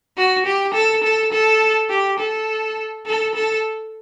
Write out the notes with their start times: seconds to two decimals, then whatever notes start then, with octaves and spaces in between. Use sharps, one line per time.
0.17 F#4
0.46 G4
0.74 A4
1.03 A4
1.32 A4
1.90 G4
2.19 A4
3.06 A4
3.35 A4